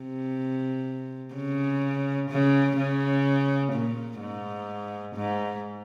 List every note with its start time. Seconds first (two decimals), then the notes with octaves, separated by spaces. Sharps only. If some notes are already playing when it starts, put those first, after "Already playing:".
Already playing: C3
1.34 C#3
2.30 C#3
2.77 C#3
3.73 A#2
4.20 G#2
5.15 G#2